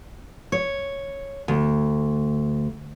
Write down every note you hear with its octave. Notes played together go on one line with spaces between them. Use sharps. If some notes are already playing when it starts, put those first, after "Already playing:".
C#5
D2